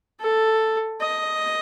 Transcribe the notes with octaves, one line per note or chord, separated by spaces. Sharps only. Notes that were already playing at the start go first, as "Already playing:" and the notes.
A4
D#5